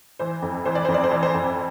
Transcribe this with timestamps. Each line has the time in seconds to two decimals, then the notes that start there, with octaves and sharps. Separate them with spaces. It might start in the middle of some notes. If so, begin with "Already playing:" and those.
0.19 E3 C5
0.42 F2
0.65 E3 C5
0.75 D5
0.85 F2 C5
0.94 D5
1.04 C5
1.11 E3 D5
1.23 C5
1.34 F2